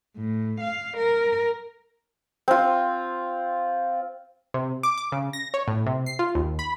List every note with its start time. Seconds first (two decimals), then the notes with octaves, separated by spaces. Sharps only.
0.17 A2
0.60 F5
0.97 A#4
2.48 C4 F4
4.54 C3
4.83 D6
4.98 D6
5.12 C#3
5.33 A#6
5.54 C#5
5.68 A2
5.86 C3
6.06 C7
6.19 F4
6.35 D#2
6.59 B5